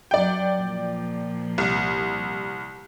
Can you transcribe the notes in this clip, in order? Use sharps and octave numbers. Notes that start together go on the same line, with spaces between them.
F#2 F#3 D5 G5
A#2 F3
C2